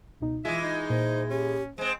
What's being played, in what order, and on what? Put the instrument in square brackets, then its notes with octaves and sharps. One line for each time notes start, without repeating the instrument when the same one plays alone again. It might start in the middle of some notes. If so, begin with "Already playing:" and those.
[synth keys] C#2 B2 D#4
[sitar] E3 G#3 [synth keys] F4 [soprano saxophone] E5
[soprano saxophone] D#4
[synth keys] A#2 [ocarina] C5
[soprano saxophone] C#4 [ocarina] G4
[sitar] G#3 C4 [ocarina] C5